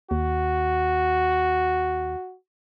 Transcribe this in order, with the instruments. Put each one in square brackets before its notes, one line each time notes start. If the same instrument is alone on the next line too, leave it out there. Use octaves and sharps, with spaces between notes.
[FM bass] D#2 [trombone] F#4